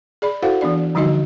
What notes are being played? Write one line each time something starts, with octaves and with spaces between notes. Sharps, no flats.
G#4 D5 B5
E4 F#4 A4 C5 F5 F#5
E3 B3 D4 D5
D3 F3 G3 D#4 F#4 D#5